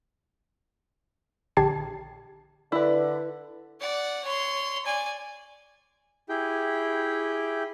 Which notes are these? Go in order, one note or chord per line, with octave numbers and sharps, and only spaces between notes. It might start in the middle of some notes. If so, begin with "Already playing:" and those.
A#1 D3 G4 A5 G#6 C7
D3 E4 B4
D5 F#5
C#5 C6
D5 G#5
E4 G4 G#4 G5